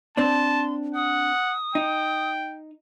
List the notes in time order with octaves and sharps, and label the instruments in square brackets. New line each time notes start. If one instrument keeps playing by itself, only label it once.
[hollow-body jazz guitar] C4 D4 [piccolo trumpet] A5 [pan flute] C6
[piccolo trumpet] F#5 [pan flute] D#6
[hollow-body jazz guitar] D#4 [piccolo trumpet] G5